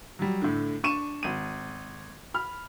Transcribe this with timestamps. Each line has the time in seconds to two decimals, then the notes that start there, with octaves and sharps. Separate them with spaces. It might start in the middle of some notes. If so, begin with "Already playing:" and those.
0.19 F#3 G3
0.42 A2 D3
0.83 D4 C#6 D#7 E7
1.23 G#1 D#7
2.34 B5 F6